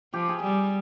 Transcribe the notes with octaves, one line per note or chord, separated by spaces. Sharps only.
F3 G4
G#4
G3